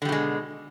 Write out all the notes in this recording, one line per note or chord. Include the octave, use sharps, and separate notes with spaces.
B2 D3 G3 G#3